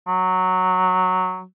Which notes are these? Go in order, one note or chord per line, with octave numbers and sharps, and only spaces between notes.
F#3